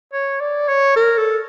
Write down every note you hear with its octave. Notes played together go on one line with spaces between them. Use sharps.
C#5
D5
C#5
A#4
A4